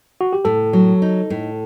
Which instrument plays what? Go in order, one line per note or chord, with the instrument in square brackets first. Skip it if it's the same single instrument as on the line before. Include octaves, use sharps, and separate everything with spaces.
[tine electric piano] F#4
G4
[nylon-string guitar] A2 [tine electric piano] A4
[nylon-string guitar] F#3
D#4
A2